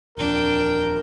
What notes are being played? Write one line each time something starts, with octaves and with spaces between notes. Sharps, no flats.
D#1 F2 D4 A#4 G5